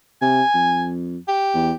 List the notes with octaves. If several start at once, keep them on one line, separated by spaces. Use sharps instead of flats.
C3 G#5
F2
G4
E2